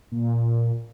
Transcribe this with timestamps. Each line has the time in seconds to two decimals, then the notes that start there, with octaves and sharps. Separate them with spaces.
0.12 A#2